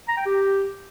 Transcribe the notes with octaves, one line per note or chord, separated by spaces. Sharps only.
A#5
G5
G4